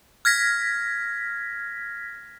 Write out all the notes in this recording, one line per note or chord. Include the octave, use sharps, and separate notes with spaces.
F6 G#6 A#6 B6